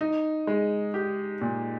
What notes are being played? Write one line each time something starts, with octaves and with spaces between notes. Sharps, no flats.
D#4
G#3
G4
A#2